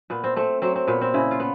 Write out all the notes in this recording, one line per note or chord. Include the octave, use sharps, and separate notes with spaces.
A#2 B3
C4
A3 C4
F#3 C4
C4
A#2 B3
C4
C#3 E4
F4
B3